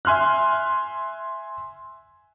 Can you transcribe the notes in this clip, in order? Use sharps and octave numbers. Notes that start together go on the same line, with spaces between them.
E5 G#5 C6 F6 F#6